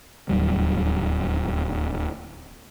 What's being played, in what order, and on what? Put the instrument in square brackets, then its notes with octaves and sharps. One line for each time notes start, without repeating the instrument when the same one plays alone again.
[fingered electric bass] D1 D#2 F#3 G3